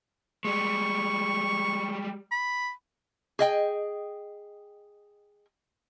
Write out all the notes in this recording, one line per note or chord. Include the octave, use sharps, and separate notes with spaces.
G3 G#3 C#6
B5
G#4 D#5 G5